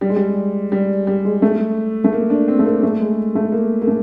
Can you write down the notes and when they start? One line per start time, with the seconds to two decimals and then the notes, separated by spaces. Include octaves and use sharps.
0.01 G3
0.09 G#3
0.16 G3
0.72 G3
1.07 G3
1.25 G#3
1.42 A3
2.04 A3
2.13 A#3
2.30 D4
2.48 C4
2.59 A3
2.66 A#3
2.83 A3
3.00 G#3
3.35 A3
3.52 A#3
3.82 A#3
3.87 A3